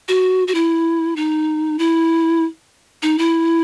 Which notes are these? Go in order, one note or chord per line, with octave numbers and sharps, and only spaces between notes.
F#4
F#4
E4
D#4
E4
D#4
E4